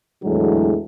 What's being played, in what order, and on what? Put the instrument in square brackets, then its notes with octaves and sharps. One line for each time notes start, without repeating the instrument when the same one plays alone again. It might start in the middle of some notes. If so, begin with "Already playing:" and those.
[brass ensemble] E2 A2 D3 F#3 G#3